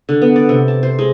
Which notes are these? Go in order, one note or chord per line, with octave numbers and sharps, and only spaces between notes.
D3
B3
D5
C3
A5
C5
G#3